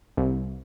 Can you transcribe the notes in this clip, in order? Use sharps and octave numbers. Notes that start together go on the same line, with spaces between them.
C2